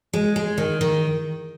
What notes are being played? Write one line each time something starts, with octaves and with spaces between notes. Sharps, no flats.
G#3
G#3
D#3
D#3